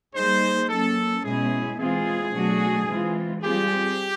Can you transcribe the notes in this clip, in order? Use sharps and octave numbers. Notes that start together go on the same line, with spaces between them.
G3 A#3 D#4 G#4 C5
F#3 A#3 C#4 A4
B2 G#3 C#4 E4 G#4
E3 G#3 C4 F4 G#4
B2 F#3 A3 D4 F#4
E3 G#3 C4 F4
G3 C4 F4 G4 G#4